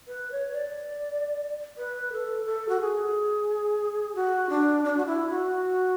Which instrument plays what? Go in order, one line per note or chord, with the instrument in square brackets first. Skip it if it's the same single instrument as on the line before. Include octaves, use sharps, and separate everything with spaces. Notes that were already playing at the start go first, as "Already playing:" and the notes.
[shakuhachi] B4
C#5
D5
B4
A4
A4
F#4
G#4
F#4
D4
D4
F#4
E4
F#4